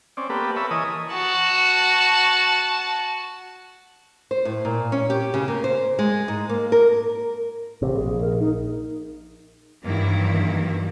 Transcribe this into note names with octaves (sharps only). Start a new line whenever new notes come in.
C4 C#4 D5
A#3 B3 G4 A4 B4
A#4 B4 C#5 E5 A5 B5
E3 A#4 C#5 D#5 G#5 D#6
F#4 A5
C5
A2
A#2
C#4
G4
C#3
A#3
C5
G#3
G#2
A#3
A#4
A1 C3
A#1 G#4
A#4
D#4
G2 D#3 E3 F#3 A#3 E4